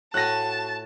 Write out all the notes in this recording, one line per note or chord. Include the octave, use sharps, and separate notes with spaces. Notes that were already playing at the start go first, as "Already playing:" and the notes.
A2 F#4 F#5 G#5 A5 F#6 A#6